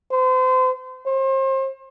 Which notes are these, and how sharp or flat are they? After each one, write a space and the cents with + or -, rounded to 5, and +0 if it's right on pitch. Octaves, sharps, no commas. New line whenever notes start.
C5 -35
C5 +35